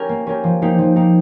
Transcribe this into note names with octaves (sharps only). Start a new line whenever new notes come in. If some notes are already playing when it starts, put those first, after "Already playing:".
Already playing: C#4 G4 A#4
A#3
C#4 G4 A#4
F3
A#3 D#4 G4
F3
A#3 D#4 G4